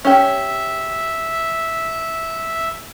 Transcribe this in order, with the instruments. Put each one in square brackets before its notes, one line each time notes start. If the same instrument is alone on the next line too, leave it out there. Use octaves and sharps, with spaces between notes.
[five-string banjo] C#4 G4 [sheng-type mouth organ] E5